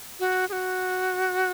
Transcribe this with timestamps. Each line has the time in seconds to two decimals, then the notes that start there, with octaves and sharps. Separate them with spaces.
0.19 F#4
0.49 G#4
0.52 F#4